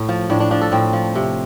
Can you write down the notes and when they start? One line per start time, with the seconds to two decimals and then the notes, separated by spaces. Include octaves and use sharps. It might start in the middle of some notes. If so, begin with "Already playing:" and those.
Already playing: A2
0.09 F3
0.30 A2 D4
0.40 D4
0.51 F3 D4
0.61 A4
0.72 A2 C4
0.93 F3
1.15 C3